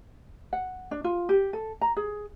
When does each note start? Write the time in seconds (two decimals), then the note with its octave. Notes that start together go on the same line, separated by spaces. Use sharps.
0.53 F#5
0.91 D4
1.04 F4
1.29 G4
1.53 A4
1.81 A#5
1.97 G#4